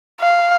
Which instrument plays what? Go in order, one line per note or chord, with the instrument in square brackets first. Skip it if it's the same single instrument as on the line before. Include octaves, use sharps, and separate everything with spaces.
[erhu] F5